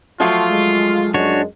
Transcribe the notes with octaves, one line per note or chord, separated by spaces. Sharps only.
F3 F#3 A3 F4
G#3
F#2 G#3 D4 F#4 C#5